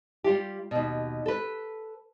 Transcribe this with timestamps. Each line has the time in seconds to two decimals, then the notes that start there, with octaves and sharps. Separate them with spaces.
0.24 G3 F4 G4
0.71 D#2 B2
1.26 A4 B4